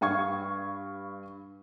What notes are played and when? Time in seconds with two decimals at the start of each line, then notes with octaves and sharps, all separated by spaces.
0.01 G2 F5 C#6 G#6